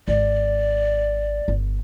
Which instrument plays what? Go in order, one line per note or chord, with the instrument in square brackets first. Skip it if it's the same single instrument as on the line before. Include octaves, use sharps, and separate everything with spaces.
[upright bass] G#1 [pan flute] D5
[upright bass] G1